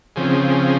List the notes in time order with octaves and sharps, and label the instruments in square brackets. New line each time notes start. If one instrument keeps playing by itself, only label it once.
[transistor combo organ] C#3 F3 C4 G#4